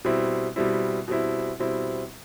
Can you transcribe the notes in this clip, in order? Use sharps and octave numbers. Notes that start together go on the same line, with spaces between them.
B2 G3 C4 E4
B2 G3 C4 E4
B2 G3 C4 E4
B2 G3 C4 E4